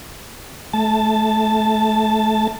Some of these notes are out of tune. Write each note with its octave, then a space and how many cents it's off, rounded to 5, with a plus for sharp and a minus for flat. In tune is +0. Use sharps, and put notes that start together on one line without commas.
A3 -25 A5 +0